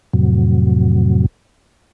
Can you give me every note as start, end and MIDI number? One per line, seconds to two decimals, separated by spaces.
0.13 1.26 41
0.13 1.26 45
0.13 1.26 48
0.13 1.26 54